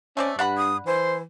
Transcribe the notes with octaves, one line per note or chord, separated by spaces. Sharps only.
A3 C4 C#4 D5
G2 D4 F#5 B5
D#6
E3 C5